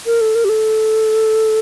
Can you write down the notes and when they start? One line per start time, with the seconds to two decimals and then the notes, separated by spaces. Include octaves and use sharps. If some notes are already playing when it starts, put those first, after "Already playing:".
0.06 A#4
0.21 A4
0.35 A#4
0.44 G4
0.49 A4